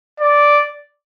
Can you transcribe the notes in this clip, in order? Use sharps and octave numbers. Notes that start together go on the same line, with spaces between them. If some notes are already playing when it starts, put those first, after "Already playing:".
D5